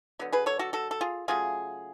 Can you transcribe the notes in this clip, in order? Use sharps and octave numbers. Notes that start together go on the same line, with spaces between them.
D3 F#3 B3
G#4 B4
A4 C#5
F#4 A4
F#4 A4
A4
F4 G#4
C#3 F#3 A3 F4 G#4